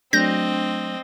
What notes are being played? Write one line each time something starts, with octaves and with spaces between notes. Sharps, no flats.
F#3 A3 C4 D4 D#5 G6 A#6